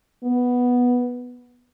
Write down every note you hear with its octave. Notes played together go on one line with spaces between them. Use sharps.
B3